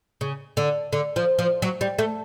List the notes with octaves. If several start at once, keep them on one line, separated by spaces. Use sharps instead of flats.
C#3
D3
D3
F3
F3
F#3
G3
A3